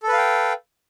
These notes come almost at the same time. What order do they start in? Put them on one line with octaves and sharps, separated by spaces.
A4 B4 F5 G5